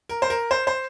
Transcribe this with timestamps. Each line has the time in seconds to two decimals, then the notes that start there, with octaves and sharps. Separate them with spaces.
0.09 A#4
0.22 C5
0.30 A#4
0.51 C5
0.67 C5